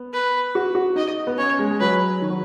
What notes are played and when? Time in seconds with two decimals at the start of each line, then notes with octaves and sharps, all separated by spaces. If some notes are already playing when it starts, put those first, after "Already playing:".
Already playing: B3
0.13 B4
0.55 F#4
0.75 F#4
0.96 D#4 D#5
1.27 B3
1.38 C#4 C#5
1.59 G#3
1.71 G#3
1.80 F#3 B4
2.22 D#3
2.29 F#3